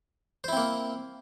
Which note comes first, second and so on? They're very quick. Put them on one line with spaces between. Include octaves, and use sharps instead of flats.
C5 E4 C4 A#3